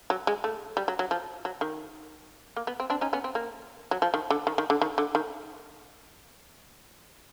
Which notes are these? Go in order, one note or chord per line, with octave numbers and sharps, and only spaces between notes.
F#3
G#3
A3
G3
F#3
F#3
F3
F#3
D#3
A#3
B3
C4
C4 D4
C#4 D#4
B3 C#4
C4
A#3
F#3
F3
D#3
D3
D#3
D#3
D3
D#3
D3
D#3